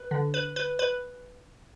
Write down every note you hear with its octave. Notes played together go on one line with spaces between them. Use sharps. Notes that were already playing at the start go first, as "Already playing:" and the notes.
Already playing: B4
D3
B4
B4
B4